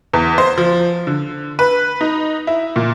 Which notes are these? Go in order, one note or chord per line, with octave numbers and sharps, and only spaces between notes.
E2
C5
F3
D3
B4
D#4
E4
A#2